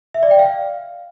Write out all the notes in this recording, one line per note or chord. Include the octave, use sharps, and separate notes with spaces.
E5
D5
G5
F5